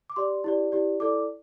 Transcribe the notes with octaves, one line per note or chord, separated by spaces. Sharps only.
D6
G4 D5 C6
E4 G4 D5
E4 G4 D5
E4 A4 D5 D6